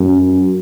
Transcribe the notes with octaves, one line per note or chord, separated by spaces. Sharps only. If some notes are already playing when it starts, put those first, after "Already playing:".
Already playing: F#2